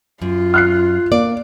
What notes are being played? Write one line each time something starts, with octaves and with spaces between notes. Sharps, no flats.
F#2 F4
F6 F#6 C7
A#3 D5